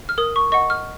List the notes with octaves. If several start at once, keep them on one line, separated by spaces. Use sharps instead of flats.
F6
A#4 D#6
C#6
D#5 F#5 C#6
F6